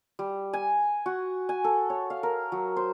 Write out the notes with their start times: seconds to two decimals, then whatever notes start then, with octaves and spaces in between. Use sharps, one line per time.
0.19 G3
0.53 G#5
1.06 F#4
1.49 G#5
1.64 A4
1.90 C#5
2.10 F5
2.23 A#4
2.52 F#3
2.76 C5